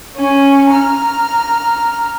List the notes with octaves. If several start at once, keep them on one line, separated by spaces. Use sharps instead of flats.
C#4 G#5
A#5 F6